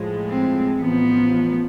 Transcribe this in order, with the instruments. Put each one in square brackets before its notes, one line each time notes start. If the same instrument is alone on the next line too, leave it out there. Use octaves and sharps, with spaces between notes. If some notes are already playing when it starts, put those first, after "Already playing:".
Already playing: [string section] A2 F3 G#3
[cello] C4
[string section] A1 A2 F3 [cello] B3